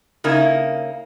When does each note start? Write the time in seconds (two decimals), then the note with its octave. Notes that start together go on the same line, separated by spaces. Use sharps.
0.24 C#3 A#3 D#4 E4